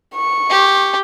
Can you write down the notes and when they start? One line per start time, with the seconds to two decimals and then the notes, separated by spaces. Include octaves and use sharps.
0.16 C#6
0.50 G4